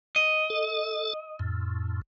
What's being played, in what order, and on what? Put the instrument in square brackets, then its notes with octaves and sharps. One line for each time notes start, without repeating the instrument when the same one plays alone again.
[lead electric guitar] D#5
[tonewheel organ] A4
F2 A2